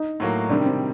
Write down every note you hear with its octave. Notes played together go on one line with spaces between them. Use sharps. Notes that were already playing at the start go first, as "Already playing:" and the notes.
Already playing: D#4
A2 F#3 A#3
C3 D#3 G3 D4
C4